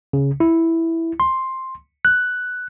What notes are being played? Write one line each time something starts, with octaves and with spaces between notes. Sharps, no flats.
C#3
E4
C6
F#6